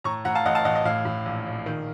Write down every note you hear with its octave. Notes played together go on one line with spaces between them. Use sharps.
A2 A#5 C#6
A2 F#5 A#5
F5 A5
A1 D#5 F#5
F5 A5
A1 D#5 F#5
D#5
A2 F5
A2
A#1
A#1
D#3